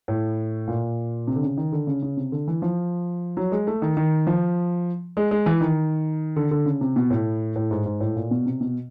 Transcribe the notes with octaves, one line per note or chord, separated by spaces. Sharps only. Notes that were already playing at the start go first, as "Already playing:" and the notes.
A2
A#2
C3
D3
C#3
D#3
D3
C#3
C#3
C3
D3
E3
F3
F#3
G#3
A3
D#3
D#3
F3
G#3
G#3
E3
D#3
D3
D3
C#3
C3
B2
A2
A2
G#2
G#2
A2
A#2
B2
C3
B2